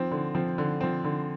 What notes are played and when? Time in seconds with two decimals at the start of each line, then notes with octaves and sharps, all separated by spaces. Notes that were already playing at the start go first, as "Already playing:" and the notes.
Already playing: F3 C4
0.11 D3
0.35 F3 C4
0.58 D3
0.81 F3 C4
1.04 D3